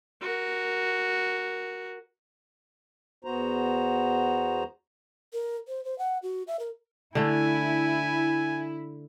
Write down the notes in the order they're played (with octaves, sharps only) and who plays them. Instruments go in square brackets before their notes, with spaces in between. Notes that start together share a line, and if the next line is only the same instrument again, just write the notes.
[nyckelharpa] F#4 A#4
[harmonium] E2 B3 F#4 C5 A#5
[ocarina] A#4
C5
C5
F#5
F#4
E5
A#4
[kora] D3 A3 [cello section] E4 [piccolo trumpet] G#5